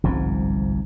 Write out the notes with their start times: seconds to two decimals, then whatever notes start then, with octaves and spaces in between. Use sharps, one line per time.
0.03 G1 C2 G#2 F3